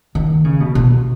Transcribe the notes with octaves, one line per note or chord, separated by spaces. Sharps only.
D#3
C#3
B2
B2